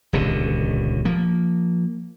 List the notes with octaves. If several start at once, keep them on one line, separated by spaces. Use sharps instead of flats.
D#1 C#2 B2 D3
F3 A#3